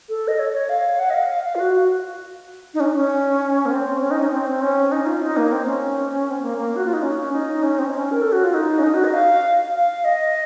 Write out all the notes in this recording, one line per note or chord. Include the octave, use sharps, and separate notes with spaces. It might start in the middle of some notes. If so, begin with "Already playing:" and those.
A4
D#5
C#5
C#5
F5
F#5
D#5
F5
F5
F5
F4
F#4
D#4
C#4
C#4
A#3
C4
C#4
D#4
C#4
C4
C#4
D#4
F4
D#4
A#3
C4
C#4
C4
A#3
A#3
F#4
F4
D#4
C#4
D#4
C#4
C4
D#4
C#4
A#4
A4
F#4
F4
D#4
C#4
D#4
F#4
D#5
F5
F5
D#5